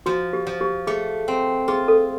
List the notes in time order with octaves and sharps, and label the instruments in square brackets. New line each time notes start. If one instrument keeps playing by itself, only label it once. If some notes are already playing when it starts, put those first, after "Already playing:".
[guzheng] F3 [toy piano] F#4
[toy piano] G4
[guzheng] F3
[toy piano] G4
[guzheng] A3 [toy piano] G#4
[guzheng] C4
[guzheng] F4 [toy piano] G#4
[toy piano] A4